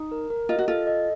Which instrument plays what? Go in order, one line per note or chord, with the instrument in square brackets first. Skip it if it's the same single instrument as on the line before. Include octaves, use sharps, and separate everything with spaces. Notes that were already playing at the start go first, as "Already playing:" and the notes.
Already playing: [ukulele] D#4
[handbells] A#4
A#4
[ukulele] F4 [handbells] D#5
[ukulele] F#4
[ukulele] F4 [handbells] A4
[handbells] D#5